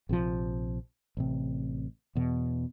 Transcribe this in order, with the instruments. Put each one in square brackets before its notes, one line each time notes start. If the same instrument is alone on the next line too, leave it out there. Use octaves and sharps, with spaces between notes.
[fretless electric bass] A#1 C3 E3 F3
A1 C3
E2 B2